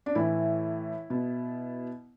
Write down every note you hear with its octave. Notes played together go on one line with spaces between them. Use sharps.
D4
A2 E3 E4
B2